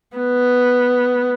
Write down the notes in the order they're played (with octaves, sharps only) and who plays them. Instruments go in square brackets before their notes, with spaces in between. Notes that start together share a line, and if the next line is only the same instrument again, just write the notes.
[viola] B3